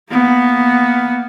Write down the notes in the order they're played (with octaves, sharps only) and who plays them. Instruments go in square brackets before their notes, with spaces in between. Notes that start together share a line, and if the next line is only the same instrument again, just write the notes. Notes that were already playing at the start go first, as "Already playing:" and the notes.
[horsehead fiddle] A#3 B3